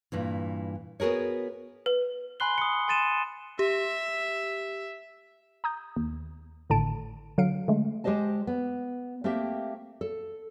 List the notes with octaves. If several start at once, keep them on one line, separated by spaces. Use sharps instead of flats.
G2 A#2 E3
B3 F#4 G#4 A#4 C#5
B4
G#5 B5 C6 F#6 C7 G7
D#6 C#7
G#5 C6 A6 D#7 E7
G4 E5
A#5 D#6 G6
D#2
G#1 A2 D3 A5 D7
D3 F#3 F5 C#7 D7
D3 G#3 A3
G#3 G4 C5 D#5 A5
B3
A3 A#3 C4 G4 E5
A4